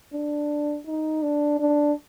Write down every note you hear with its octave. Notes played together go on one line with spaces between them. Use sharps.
D4
D#4
D4
D4